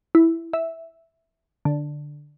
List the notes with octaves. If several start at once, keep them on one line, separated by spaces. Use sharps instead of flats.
E4
E5
D3